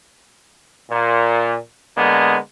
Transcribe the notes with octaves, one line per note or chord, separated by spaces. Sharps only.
A#2
D3 G#3 A#3 B3